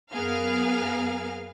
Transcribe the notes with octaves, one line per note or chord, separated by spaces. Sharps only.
F#2 B3 G#4 A#4 F5 F6